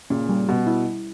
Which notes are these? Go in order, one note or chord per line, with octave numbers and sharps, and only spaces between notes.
A#2 C#3 C#4
G3
B2 G3
E4